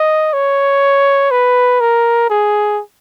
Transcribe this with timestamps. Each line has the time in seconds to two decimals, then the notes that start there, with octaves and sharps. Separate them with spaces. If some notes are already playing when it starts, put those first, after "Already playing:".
Already playing: D#5
0.33 C#5
1.31 B4
1.80 A#4
2.30 G#4